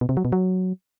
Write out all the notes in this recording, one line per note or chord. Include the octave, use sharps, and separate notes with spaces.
B2
C3
F#3
B2
F#3